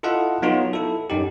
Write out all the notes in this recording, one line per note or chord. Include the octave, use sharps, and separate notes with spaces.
E4 F4 A4 D#5 F5 F#5
F#3 B3 D#4 F4 F#4
E4 A4
F#2 D#4 G4